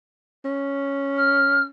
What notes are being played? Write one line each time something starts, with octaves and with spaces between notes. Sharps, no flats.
C#4
F6